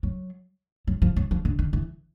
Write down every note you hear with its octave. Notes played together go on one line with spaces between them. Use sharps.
F#3
F#3
F3
F#3
F3
D3
D#3
E3